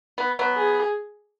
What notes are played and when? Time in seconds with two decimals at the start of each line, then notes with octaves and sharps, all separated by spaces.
0.18 B3
0.39 F#3 B3
0.56 G#4